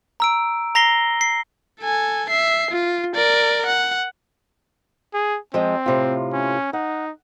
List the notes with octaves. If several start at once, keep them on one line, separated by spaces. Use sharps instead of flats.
A#5 E6 D7
A#5 A#6 C7 G7
C7
A4 G#5
E5 C7
F4
A#4 D5
F#5
G#4
F3 G#3 C4
A2 C3 F4
C#4
D#4 F#5